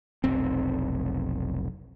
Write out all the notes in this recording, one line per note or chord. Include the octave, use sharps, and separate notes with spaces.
F1 B1 C4